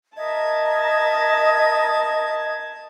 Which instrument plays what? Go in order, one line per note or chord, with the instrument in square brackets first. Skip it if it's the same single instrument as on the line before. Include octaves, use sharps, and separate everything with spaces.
[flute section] A#4 D#5 E5 [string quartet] A5 G#6